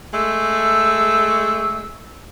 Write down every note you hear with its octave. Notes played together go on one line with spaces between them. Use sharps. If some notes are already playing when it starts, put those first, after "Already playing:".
G#3 A3 E6